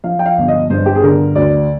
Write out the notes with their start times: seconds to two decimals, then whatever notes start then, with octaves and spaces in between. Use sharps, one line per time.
0.04 F3 F5
0.19 G5
0.26 F5
0.38 G1
0.48 D#5
0.70 G2 C5
0.86 G4
0.95 G#4
1.03 D3 A#4
1.35 D2 D5